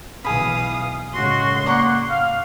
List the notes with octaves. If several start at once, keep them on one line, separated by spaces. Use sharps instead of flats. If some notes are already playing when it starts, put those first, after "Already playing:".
B1 B2 E3 G#4 F5 B5 D#6
F#2 A2 C#3 G#3 F#4 C6
A#3 D5 F#5 A#5 C#6
F5